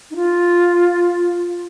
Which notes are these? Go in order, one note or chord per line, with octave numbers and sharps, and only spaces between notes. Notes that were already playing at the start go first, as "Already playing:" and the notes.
D#4
F4